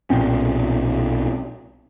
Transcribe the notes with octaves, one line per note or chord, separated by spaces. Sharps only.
B1 A#2 C4 C#4